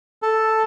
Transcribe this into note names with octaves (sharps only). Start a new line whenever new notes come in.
A4